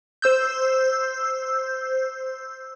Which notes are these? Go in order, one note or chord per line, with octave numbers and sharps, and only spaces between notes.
C5 E6 G6